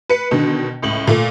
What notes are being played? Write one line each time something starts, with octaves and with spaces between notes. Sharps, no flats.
B4 C#7
B2 D3 D#3
C#2 A2 F#7
A#2 A3